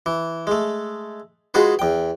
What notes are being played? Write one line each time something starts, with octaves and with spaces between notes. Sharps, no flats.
E3
G#3 A3
G#3 F4 F#4 G#4 B4
E2 G5